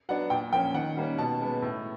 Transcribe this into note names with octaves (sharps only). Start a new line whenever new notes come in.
F#3 B3 D4 F#5
A#2 G5
F3 A#3 C#4 G5
D#3 F#5
G3 A#3 C#4
B2 A5
G#3 B3
A2